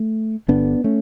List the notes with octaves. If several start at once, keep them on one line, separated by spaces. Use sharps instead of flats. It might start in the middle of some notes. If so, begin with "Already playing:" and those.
Already playing: A3
G1 G2 D3 B3 D4
A3 C#4